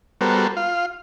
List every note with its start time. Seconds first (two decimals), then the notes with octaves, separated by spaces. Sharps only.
0.21 G3 B3 F#4 A4 A#4 C5
0.57 F4 F5